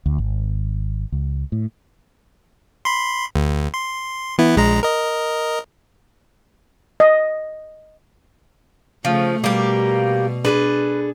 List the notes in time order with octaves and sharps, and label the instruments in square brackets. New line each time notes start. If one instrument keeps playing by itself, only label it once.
[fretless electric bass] D2
G#1
C#2
A2
[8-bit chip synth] B5 C6
D2
C6
E3 B3 E4
A#1 G#3 A#5
A#4 D#5
[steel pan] D#5
[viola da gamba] C#3 A3 [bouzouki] F3
[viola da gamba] B2 [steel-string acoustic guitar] G3 [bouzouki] A#3 G4
[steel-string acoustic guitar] D4 G#4 A4 [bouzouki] B4